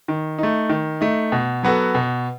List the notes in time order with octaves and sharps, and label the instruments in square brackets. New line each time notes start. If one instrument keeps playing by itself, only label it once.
[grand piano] D#3
A3 D#4
D#3
A3 D#4
B2
F#3 B3 F#4 A4
B2